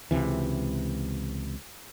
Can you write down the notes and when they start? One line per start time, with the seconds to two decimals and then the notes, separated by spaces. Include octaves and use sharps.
0.11 C#2 C3 E3